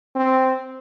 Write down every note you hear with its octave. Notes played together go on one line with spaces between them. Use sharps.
C4